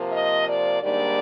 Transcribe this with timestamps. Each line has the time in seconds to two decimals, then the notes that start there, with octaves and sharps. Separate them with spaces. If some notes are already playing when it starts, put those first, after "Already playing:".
Already playing: C3 F3 A#3
0.12 D#5
0.47 D5
0.82 G#2 D#3 G3 A#3 D4 D5